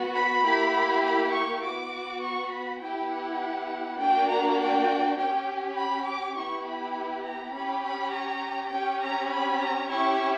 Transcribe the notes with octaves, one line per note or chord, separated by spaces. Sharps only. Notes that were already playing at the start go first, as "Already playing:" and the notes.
Already playing: B3 F#4
B5
A#3 E4 G4
B5
C#6
B3 F#4 D6
C#6
B5
B3 E4 G4 G5
F#5
A#3 D4 F#4 G5
A#5
G5
C#4 G4 G5
B5
D6
B3 E4 G4 C#6
B5
A#5
C#4 G4 B5
B5
A#5
C#4 G4 G5
A#5
B5
A#5
C#4 E4 G4 C#6